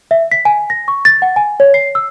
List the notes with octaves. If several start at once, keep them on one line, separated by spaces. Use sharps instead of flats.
E5
B6
G#5
A#6
C#6
A6
F#5
G#5
C#5
C7
E6